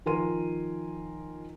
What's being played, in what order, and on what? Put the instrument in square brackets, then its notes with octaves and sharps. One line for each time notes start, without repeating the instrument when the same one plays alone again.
[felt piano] D#3 F3 A#4 G#5 C6 D#7